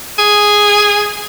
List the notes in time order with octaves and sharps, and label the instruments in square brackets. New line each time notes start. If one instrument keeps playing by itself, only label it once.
[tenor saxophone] G#4